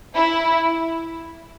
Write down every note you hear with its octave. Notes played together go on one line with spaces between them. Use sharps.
E4